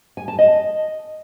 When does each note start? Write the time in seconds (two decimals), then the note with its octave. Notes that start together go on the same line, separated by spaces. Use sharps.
0.17 G#5
0.28 A5
0.39 D#5